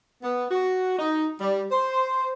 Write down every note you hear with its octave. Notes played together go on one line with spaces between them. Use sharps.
B3
F#4
D#4
G3
C5